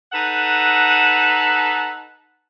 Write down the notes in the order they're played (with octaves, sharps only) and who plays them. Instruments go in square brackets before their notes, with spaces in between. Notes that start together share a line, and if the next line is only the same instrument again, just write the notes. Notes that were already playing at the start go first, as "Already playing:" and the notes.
[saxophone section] D#4 A4 B4 F#5